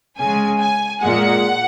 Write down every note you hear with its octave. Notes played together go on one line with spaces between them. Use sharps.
C#3 G#3 G#5
G#5
A#2 G#3 F#5